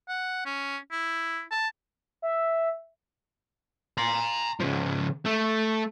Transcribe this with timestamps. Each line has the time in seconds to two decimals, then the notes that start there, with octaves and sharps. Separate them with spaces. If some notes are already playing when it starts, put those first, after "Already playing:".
0.09 F#5
0.46 C#4
0.91 E4
1.51 A5
2.22 E5
3.98 A#5 C6
4.60 C#3 F3
5.26 A3